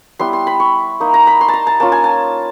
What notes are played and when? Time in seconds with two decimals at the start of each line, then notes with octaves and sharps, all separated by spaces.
0.19 G3 B3 E4 C6
0.33 C6
0.47 B5
0.60 C#6
1.00 A#3 D#4
1.14 A#5
1.27 B5
1.41 C6
1.48 A5
1.53 A#5
1.67 A5
1.80 A#3 C#4 F4 A5
1.92 G#5
2.04 A5